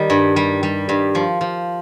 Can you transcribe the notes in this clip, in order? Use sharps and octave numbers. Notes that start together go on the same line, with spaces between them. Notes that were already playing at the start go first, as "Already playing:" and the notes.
Already playing: D#3 G3
G2
G3
G3
G2
F3
F3